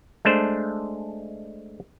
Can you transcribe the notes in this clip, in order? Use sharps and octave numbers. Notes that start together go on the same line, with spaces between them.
G#3 A3 D4 C5